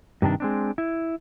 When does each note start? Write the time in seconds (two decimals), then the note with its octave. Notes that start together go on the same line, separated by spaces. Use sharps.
0.22 G2 C3 D#3 D4
0.40 G#3 C4 D4
0.78 E4